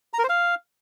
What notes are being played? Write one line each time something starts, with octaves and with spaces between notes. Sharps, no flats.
A#5
A#4
C5
F5